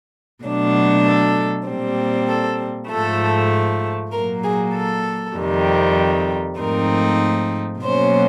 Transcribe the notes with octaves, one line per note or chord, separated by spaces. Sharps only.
B2 F#3 A3 D4
A4
A#2 G3 C4
A4
G#2 F3 A3 A4
A#2 F#3 A#3 A#4
G#4
A4
F2 C3 D#3 G3
G#2 F3 A3 C4 D#4 A#4
B2 F#3 A#3 C#4 C5